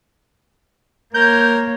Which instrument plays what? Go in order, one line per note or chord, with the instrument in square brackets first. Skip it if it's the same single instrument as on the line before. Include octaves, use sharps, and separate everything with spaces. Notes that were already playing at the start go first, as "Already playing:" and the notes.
[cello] A#3 C#5 [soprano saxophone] A#4 [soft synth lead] G6